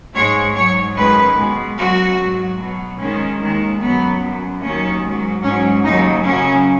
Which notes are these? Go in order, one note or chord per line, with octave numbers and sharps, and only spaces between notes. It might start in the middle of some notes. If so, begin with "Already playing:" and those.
G#2 G#3 C#5
F#3 C#5
G#2
F#2 D#3 G#3 B4
B2 G#3
F#2 F#3 F#4
G#2 F#3
B2 F#3
G#2 D#3 G#3 C#4
D#2 D#3 G#3
F#2 F#3 B3
F#2 F#3
D#2 D#3 F#3 C#4
G#2 F#3
G#2 F#3 C#4
D#2 C#3 F#3 D#4
F#2 C#3 F#3 C#4